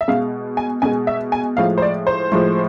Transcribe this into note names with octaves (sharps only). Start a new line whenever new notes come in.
E5
B2 G#3 F5
G#5
B2 G#3 G#5
E5
G#5
A2 F3 G#3 F5
C5
D5
C5
A2 F3 G#3